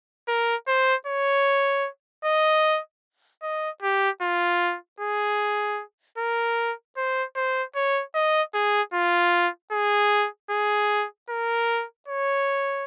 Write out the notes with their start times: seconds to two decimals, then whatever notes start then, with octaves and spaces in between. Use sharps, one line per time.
0.28 A#4
0.67 C5
1.07 C#5
2.25 D#5
3.42 D#5
3.82 G4
4.22 F4
5.00 G#4
6.18 A#4
6.97 C5
7.36 C5
7.75 C#5
8.15 D#5
8.54 G#4
8.94 F4
9.72 G#4
10.50 G#4
11.30 A#4
12.08 C#5